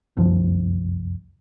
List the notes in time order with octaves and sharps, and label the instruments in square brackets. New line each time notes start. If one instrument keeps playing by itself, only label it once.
[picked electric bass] F1 C2 F#2 F3